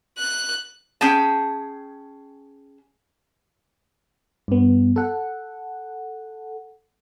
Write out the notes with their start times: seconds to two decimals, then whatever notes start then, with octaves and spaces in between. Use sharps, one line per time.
0.18 F#6
1.01 C#4 G#4 G5 A5
4.48 G2 B3
4.96 A4 F#5